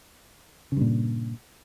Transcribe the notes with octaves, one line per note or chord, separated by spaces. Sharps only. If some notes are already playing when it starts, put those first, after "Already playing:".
G2 A#2 C#3